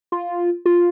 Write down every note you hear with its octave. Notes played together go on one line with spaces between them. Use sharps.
F4
F4